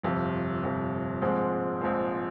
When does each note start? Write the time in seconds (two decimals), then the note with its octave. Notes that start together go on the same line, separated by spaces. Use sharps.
0.03 G1 F2 C3
0.63 G1 F2 C3
1.22 A#1 G#2 F3 G#3 C4
1.81 A#1 G#2 F3 G#3 C4